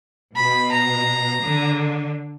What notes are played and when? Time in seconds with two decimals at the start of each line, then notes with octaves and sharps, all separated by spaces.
0.36 B2 B5
0.72 A#5
1.44 D3